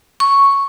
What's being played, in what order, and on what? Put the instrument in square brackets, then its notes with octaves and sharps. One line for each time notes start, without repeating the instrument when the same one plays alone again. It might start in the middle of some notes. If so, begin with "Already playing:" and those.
[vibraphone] C#6